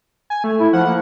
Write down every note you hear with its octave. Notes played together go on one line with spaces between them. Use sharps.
G#5
A3
E4
F3 F#5
A#3